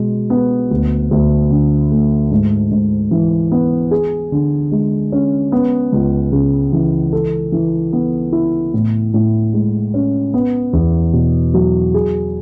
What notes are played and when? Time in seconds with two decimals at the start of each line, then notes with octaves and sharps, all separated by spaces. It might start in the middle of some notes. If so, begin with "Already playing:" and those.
Already playing: B2 G#3
0.30 B3
0.71 D2
1.11 D2
1.50 D3
1.91 A3
2.31 G#2
2.71 G#2
3.11 E3
3.52 B3
3.91 G#4
4.32 D3
4.72 G#3
5.12 C#4
5.52 B3
5.92 C#2
6.32 C#3
6.72 E3
7.13 A4
7.52 E3
7.93 B3
8.32 E4
8.74 A2
9.14 A2
9.53 G#3
9.94 C#4
10.34 B3
10.73 E2
11.13 B2
11.54 F#3
11.94 G#4